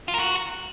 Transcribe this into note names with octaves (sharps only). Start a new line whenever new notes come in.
F4
A#4
F#4